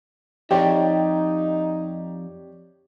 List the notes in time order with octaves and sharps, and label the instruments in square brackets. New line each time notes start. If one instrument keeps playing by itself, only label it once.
[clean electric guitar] F2 [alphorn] D#4 [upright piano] G4 C#5 D5 [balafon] G5